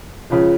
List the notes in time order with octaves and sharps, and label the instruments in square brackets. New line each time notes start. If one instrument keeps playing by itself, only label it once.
[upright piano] C#2 C#3 F3